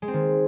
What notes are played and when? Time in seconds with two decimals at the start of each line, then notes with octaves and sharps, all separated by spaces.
0.02 G#3
0.08 C4
0.14 D#3